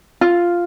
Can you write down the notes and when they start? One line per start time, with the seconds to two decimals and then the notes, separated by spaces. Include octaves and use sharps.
0.21 F4